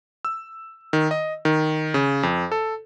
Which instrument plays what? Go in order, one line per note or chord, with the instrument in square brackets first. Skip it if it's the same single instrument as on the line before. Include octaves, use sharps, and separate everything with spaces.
[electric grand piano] E6
D#3
D#5
D#3
C#3
F2
A4